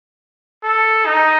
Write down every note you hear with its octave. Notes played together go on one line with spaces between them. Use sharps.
A4
D#4